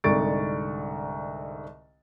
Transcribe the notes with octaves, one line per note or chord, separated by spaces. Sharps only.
C2 G#2 D3 C#6 A6 D7